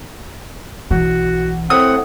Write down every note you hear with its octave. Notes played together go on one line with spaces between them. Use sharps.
B1 E3 F#4
A2 C4 F#5 D#6